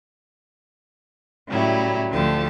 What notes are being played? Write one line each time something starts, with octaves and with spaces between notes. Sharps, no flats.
A2 C#3 F#3 G3 E4
D2 D3 F3 A3 G4 A5